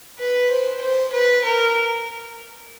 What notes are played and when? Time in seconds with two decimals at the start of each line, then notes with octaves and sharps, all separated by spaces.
0.19 B4
0.50 C5
0.81 C5
1.13 B4
1.44 A#4